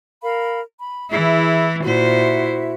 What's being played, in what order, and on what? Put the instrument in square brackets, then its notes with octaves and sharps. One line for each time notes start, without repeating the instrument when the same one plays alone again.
[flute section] A#4 F5 B5
B5
[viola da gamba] E3 E4 [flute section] G#4 E5
[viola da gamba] A#2 C5 [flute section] E4 F#4 E5